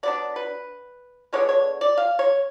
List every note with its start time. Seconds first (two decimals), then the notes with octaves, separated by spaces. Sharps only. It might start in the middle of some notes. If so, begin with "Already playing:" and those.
0.03 F#3 B3 D4 D5
0.36 B4
1.33 D3 G#3 B3 D4 C#5
1.49 C#5
1.81 D5
1.98 F5
2.19 C#5